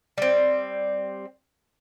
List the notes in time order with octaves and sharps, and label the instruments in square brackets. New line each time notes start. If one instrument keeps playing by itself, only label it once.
[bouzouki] G3 C4